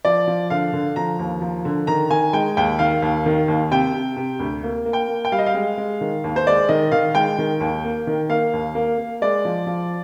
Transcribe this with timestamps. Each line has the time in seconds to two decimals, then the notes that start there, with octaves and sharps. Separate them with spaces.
0.05 F3 D5
0.28 F3
0.50 D3 F5
0.73 D3
0.96 F3 A#5
1.19 D#2
1.42 F3
1.65 D3
1.87 D#3 A#5
2.10 D#3 G#5
2.33 G#3 G5
2.57 D#2 G5
2.79 D#3 F5
3.02 D#2
3.26 D#3
3.48 D#2
3.71 C3 G5
3.94 C3
4.16 C3
4.40 D2
4.63 A#3
4.86 A#3
4.93 G5
5.08 A#3
5.25 G5
5.32 G3 F5
5.39 D#5
5.46 F5
5.54 G#3
5.78 G#3
6.01 D#3
6.24 D#2
6.36 C5
6.47 G#3 D5
6.69 D#3 D#5
6.92 D#3 F5
7.15 G#3 G5
7.38 D#3
7.60 D#2
7.84 A#3
8.07 D#3
8.29 A#3 F5
8.53 D#2
8.75 A#3
8.98 A#3
9.22 G#3 D5
9.45 F3
9.67 F3